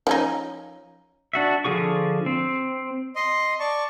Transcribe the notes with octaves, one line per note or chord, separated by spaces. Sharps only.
F3 C#4 D#4
D4 F#4 E5
D3 F3 F4 G#4 C#6
C4
D#5 C6
D5 A5 C#6